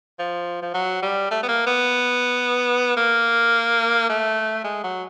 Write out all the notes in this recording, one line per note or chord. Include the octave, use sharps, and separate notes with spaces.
F3
F3
F#3
G3
A3
B3
A#3
B3
A#3
A3
G#3
F#3